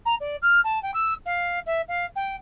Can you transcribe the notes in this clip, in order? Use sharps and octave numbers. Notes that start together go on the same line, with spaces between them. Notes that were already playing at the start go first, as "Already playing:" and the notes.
A#5
D5
F6
A5
G5
E6
F5
E5
F5
G5